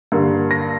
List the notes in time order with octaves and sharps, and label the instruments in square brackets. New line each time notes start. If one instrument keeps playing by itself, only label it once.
[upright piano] G2 D3 A#3
A#6